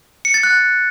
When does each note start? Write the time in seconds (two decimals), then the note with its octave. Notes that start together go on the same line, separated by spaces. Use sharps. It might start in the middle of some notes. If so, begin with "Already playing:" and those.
0.25 C#7
0.34 A6
0.43 F#6